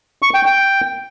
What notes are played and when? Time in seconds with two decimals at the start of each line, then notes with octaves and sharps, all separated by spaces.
0.22 C#6
0.34 G5
0.46 G5